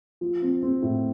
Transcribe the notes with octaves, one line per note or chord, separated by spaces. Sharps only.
F3
C4
C4
A2